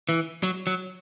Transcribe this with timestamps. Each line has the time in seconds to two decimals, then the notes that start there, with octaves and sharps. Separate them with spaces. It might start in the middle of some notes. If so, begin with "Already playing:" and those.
0.09 E3
0.43 F#3
0.67 F#3